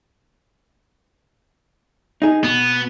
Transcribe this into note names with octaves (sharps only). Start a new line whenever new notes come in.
D#4 G#4
B2 B3